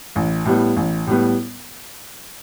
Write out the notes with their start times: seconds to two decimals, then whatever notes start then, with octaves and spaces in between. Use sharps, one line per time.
0.16 A1
0.45 A2 G3 B3
0.76 A1
1.07 A2 G3 B3